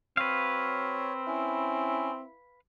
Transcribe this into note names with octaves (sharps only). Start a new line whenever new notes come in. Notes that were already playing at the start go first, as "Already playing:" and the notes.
F#3 C4 B4 C#5 F5
C#4 E4